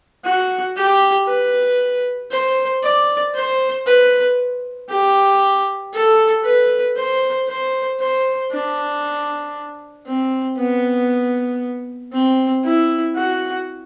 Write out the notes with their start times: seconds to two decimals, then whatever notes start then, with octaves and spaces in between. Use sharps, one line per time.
0.25 F#4
0.77 G4
1.27 B4
2.31 C5
2.83 D5
3.35 C5
3.86 B4
4.90 G4
5.93 A4
6.45 B4
6.97 C5
7.48 C5
8.00 C5
8.51 D4
10.07 C4
10.58 B3
12.13 C4
12.64 E4
13.17 F#4